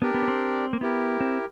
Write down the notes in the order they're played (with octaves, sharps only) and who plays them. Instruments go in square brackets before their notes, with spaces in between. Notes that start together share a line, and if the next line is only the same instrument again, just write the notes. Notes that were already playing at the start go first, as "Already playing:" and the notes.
[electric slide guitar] B3 [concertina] D4 G4 A#4 D5
[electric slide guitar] B3
C#4
C4
A#3
[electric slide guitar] B3 [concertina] E4 G4 A#4
[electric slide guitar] C4